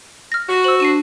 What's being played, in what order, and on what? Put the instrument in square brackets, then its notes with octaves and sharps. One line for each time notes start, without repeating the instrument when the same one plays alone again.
[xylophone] F6 A#6
[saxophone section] F#4
[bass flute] C5 [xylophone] E6 F#7
[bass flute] D4 [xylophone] C7 D#7 E7